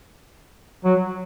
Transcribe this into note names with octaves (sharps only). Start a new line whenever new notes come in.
F#3